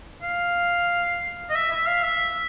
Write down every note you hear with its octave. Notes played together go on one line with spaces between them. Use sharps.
F5
D#5
E5
E5
F5
E5